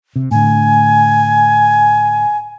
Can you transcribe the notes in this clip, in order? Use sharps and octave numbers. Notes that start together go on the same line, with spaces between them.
C3
A2 D3 G#5